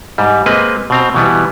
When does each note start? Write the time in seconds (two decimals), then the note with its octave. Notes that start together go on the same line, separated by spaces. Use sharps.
0.18 G#2 G3
0.46 G#3 A#3 C4 B4 D#5
0.90 B2 C4 A#5
1.15 B2 E3 G3 B3